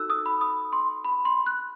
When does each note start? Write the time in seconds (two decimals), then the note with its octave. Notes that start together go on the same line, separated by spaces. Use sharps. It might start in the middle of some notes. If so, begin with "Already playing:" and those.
Already playing: D#4 F#4 A4 E6 F#6
0.10 D#6
0.26 B5
0.41 D#6
0.73 C6
1.05 B5
1.25 C6
1.46 F#6